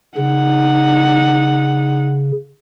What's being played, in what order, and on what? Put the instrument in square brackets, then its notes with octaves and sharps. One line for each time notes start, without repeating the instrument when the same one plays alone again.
[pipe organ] C#3 [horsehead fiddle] D#4 F#5